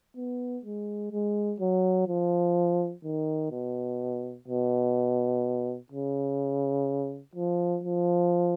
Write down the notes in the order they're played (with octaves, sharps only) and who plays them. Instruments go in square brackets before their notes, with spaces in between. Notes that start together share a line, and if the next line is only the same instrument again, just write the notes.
[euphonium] B3
G#3
G#3
F#3
F3
D#3
B2
B2
C#3
F3
F3